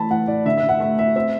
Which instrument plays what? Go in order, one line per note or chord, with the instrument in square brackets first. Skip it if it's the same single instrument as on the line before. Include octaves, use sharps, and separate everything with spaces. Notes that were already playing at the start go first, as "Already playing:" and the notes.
Already playing: [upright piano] E3 A3 A5 B5
E3 F#5
A2 D5
D3 E5
E5
D3
F#5
A3 E5
A3 E5
C4 E5